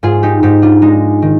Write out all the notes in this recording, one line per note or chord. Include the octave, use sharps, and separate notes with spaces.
G#2 F4 G#4
D#4 G4
G#2 D#4 G4
D4 F4
G#3 D#4
D#3